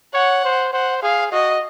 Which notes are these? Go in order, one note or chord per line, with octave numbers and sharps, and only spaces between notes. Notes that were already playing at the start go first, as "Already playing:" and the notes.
C#5 F#5
C5
C5 F#5
G#4 F5
F#4 D#5